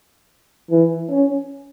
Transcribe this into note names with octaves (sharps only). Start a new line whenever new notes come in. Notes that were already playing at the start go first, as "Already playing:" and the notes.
E3
C#4